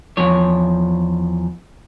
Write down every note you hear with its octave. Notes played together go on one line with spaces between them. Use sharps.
E2 F3 C#5